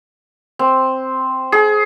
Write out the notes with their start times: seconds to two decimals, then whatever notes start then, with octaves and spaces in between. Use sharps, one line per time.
0.59 C4
1.52 G#4